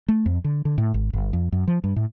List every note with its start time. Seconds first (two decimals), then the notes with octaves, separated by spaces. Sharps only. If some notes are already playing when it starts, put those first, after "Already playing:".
0.08 A3
0.26 F2
0.44 D3
0.65 D3
0.78 A2
0.94 G#1
1.13 G1
1.33 F2
1.52 F#2
1.68 F3
1.84 G2
1.96 A2